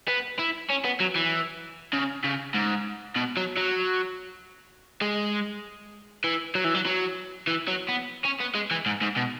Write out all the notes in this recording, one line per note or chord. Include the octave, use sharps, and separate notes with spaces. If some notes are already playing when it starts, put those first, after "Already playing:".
B3
E4
C#4
B3
F#3
E3
C#3
C#3
G#2
B2
F#3
F#3
G#3
E3
F#3
E3
F#3
F#3
E3
F#3
B3
C#4
B3
G#3
E3
G#2
G#2
B2